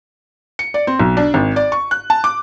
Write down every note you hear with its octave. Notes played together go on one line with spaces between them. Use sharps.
C#7
D5
C4
B1
D4
G#1
D5
C#6
F#6
A5
D6